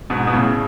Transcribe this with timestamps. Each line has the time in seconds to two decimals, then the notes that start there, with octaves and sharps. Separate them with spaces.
0.10 G#2 B2
0.27 B2
0.33 A2 C#3